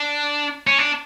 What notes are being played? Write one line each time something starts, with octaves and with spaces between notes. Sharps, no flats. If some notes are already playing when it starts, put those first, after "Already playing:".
Already playing: D4
C#4
D4